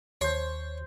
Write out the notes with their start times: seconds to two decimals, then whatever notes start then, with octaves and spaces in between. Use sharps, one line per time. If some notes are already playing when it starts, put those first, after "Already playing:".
0.21 D#2 C5 C#5 C6